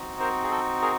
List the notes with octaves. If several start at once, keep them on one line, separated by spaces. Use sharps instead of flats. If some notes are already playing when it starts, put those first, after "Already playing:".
Already playing: C4 D#4 F#4
A#4 C5
G#4
A4
G#4 A#4